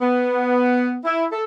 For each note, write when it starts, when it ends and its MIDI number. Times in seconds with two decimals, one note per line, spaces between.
0.01 0.98 59
1.05 1.26 64
1.32 1.43 69